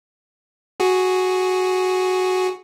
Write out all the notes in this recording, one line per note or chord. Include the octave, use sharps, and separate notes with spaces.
F#4 G#4